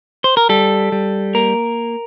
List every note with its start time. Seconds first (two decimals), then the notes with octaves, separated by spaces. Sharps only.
0.24 C5
0.37 A#4
0.49 G3 A4
0.92 G3
1.34 A#3 A#4